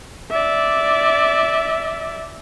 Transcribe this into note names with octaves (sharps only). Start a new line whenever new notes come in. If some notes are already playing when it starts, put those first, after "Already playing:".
D5 E5